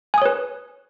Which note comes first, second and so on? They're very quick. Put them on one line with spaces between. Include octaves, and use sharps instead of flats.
G#5 D#6 C#5 B4